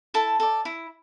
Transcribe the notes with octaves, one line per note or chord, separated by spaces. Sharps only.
E4 A4 A5
A4 D5
E4